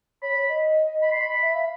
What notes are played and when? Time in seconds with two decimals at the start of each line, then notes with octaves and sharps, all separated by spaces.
0.22 C#5 B5
0.35 C#5
0.49 D#5
1.02 B5
1.11 C6
1.20 B5
1.42 E5
1.55 F5